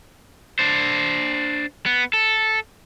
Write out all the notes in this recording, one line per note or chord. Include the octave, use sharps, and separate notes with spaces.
D4 C5
B3
A4